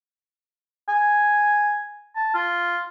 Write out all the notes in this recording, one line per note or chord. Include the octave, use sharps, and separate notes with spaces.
G#5
A5
F4